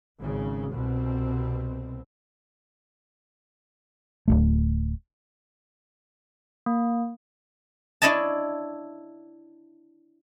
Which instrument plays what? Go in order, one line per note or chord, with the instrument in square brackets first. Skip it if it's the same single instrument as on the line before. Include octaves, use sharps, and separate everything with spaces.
[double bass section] G#1 C#3
C2 B2 C4
[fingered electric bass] D1 G#1 A3
[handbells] A#3
[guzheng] D4 E4 C#5 D#5 A5